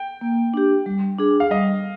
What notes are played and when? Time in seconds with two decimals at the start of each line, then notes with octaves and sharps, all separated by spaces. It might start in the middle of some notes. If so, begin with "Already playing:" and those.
Already playing: G5
0.21 A#3
0.54 D4 G4
0.86 G3
1.18 D4 G#4
1.40 F5
1.50 G3 D#5